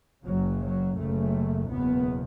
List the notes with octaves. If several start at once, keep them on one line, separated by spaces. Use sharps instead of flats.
F#1 F#2 C#3 F#3
F#3
F#1 F#2 C#3 A3
F#1 E2 B2 B3